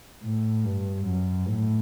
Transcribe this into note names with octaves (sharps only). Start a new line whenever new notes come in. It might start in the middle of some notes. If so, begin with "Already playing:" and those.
A2
G2
F#2
A2